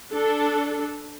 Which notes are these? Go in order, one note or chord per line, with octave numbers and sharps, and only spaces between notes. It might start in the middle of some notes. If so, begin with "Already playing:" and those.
D4 A4